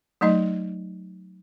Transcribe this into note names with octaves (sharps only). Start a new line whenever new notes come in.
F#3 A3 D#4 D#5